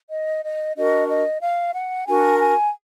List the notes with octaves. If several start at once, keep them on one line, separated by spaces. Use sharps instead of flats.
D#5
D#5
D4 F#4 A#4 D#5
D#5
F5
F#5
D4 F#4 A#4 G#5
G#5